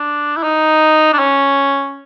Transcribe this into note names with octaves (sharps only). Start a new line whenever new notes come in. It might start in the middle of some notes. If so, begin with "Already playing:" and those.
Already playing: D4
E4
D#4
D4
C#4